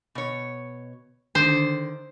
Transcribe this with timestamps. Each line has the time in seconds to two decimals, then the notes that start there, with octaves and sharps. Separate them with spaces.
0.15 B2 C#5
1.35 D3 D#3 C5